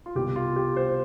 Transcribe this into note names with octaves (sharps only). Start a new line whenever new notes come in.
F4
C2 B2 G3 G4
F4
G4
C5